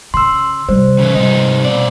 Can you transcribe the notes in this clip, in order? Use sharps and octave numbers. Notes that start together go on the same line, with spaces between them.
C#3 C6 E6
C3 G3 C5
C#3 E3
C3 G3 D#4
B2 D5